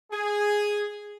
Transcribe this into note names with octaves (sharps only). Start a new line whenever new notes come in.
G#4